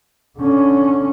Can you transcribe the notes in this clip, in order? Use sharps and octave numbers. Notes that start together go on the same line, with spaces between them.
D3 C#4